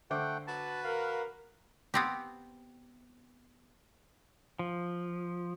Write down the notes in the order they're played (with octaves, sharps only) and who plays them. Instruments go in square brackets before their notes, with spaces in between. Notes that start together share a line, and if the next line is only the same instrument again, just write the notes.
[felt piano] D3 C5 D6 [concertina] A3 F#5 G5
[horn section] F#4 B4 [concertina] A5
[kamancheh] A#4 [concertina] F5
[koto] B3 C4 G4
[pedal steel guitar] F3